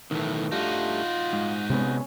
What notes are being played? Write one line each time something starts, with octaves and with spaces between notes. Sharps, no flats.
B1 A2 D#3 E3 A3
G2 G3 A3 D#4 F4 F#4
G#2
C3 G#3 B3 C#4